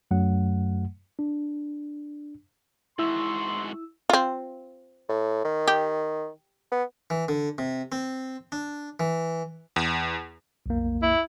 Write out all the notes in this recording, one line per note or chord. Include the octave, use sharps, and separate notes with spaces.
F#2 F#3 A3 F#5
D4
G#2 E4 F#4 C6 E6
C4 F4
A2
D#3
G4
B3
E3
D3
C3
C4
D4
E3
E2
B1 F2 A#3
E4